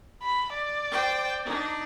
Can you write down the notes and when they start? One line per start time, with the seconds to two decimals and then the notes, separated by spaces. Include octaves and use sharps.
0.23 B5
0.54 D5
0.91 C5 G5
1.45 D4 D#4